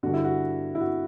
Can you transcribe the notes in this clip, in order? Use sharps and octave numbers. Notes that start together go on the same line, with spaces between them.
G2 D3 F#4
E4
F#4
E4
F#4